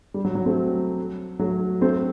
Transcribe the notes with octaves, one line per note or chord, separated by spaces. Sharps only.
G3
F#3
F#3
A3 C4
F#3 A3
A3 C4